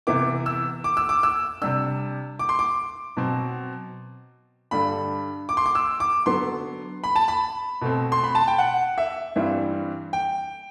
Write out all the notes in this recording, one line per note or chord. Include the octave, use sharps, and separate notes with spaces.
C3 E3 B3 E4 D6
E6
D6
E6
D6
E6
C3 G3 D4 E6
D6
C6
D6
B2 F#3 C4
G2 D3 G3 D4 B5
D6
C6
D6
E6
D6
D3 F#3 B3 C6
B5
A5
B5
B2 A3 C4
C6
B5
A5
G5
F#5
E5
G2 E3 G3 C4 E4
G5